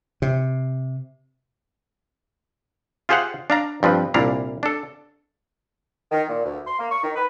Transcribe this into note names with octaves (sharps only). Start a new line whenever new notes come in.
C3
F4 G4 G#4 C5 F5 F#5
D4 F5 A#5
G2 F3 C4 B4
C2 A#2 D4 E4 F5 A#5
D4 A4
D#3
A#2
D2
C6
A#3
C#6
D#3
B4